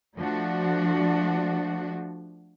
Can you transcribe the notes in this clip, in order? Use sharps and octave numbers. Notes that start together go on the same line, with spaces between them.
F3 A3 D4 F#4